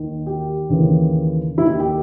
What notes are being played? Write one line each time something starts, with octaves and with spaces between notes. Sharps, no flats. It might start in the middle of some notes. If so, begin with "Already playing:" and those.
Already playing: D#2 D#3
G4
D#2 C#3 E3
D#2 D#3 E4
G4
G4